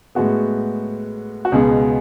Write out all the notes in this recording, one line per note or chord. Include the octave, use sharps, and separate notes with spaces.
A2 G#3 B3 F#4
F#4
C#2 B2 G#3 B3 G#4